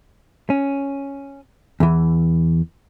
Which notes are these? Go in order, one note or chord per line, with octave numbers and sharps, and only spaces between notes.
C#4
E2 E3